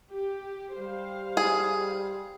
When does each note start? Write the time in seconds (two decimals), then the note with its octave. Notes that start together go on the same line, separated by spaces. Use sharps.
0.11 G4
0.78 G3 C5 F5
1.37 G#4